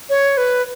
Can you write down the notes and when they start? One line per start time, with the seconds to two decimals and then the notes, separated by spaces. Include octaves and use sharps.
0.10 C#5
0.37 B4